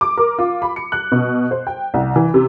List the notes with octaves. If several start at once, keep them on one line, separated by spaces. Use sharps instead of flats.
D6
A#4
F4
B5
C#7
F#6
B2
C5
G5
C2
E3
C3